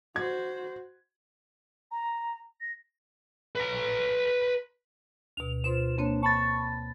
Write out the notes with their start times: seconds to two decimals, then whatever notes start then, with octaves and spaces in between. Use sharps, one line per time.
0.16 F#4 C5 G#6
1.91 A#5
2.61 A#6
3.55 B4 A#5
5.37 D2 B2 F7
5.64 B2 F4 C5 C6 E7
5.98 A#3 C4 D4 C#5
6.23 A5 B5 C#6 A6